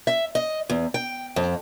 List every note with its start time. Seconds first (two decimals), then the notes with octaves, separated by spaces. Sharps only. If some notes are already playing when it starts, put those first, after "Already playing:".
0.07 E5
0.35 D#5
0.70 E2
0.94 G5
1.36 F2